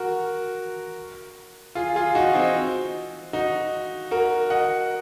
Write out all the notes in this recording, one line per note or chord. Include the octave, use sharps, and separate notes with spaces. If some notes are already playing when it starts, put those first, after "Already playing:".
Already playing: F#4 A#4
F4 G#4
F4 G#4
D#4 F#4
C4 D#4
D#4 F#4
F#4 A#4
D#5 F#5